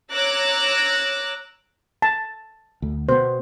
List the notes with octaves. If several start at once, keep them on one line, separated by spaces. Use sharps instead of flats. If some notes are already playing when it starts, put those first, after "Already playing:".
C#5 A#5 D6 E6 F#6 A#6
A5
D2
B2 B3 C5